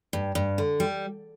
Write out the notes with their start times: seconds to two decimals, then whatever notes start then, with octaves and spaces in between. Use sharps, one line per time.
0.13 G2
0.35 G2
0.58 D3
0.80 G3